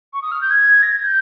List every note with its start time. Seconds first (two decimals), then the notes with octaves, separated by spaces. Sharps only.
0.13 C#6
0.22 D#6
0.32 F6
0.41 G6
0.50 G#6
0.82 A#6
0.92 G#6
1.03 G6